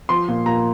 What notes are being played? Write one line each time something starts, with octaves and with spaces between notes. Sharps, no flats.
F3 C6
A#2
A#2 A#5